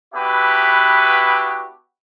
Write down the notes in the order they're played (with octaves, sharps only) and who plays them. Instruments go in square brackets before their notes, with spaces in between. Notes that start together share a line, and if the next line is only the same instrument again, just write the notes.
[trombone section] B3 D4 E4 F#4 G4 B4